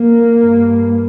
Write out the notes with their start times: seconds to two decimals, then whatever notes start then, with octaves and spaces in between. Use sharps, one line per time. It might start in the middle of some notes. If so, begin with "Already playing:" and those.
Already playing: A#3
0.36 G2